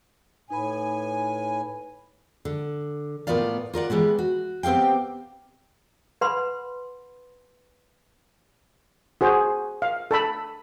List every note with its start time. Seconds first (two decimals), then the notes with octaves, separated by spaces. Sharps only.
0.50 A2 D#4 B4 G#5 B5
2.45 D3
3.27 A2 A#3 B3 F4 D5 F5
3.73 F4 A#4 D5 F#5
3.90 E3 G3 G#3 B3
4.19 F#4
4.63 B3 C4 G4 F5 G5
6.21 B4 F#5 B5 C6
9.21 F#4 G#4 C5
9.82 F5
10.11 A4 A5 B5